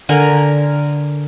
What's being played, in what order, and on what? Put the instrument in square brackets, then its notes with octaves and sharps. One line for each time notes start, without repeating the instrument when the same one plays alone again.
[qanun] D3 A#4 G#5